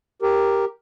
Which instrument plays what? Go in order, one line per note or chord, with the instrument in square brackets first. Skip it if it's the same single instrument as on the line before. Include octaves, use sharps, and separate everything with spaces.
[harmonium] G4 A#4